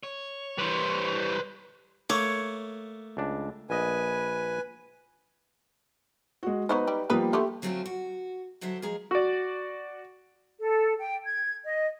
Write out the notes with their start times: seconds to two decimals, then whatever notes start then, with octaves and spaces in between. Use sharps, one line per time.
0.03 C#5
0.58 E3 G3 B4 C5
2.10 A3 A#3 C#5
3.17 C#2 D4
3.70 A#1 B4 D#5 G#5
6.43 G#3 F#4
6.69 F#3 B3 D#4 B4 C5
6.88 G3
7.10 F3 G3 A#3 B3 D#4 B4
7.33 D3 A3 G4
7.62 D3 F#3 A3 C4 C#4 F4
7.86 F#4
8.61 D3 F#3 F#4 C5 E5
8.82 F3 G#3 G#4 A#5
9.11 F#4 D5
10.60 A4
10.98 G5
11.25 G#6
11.64 D#5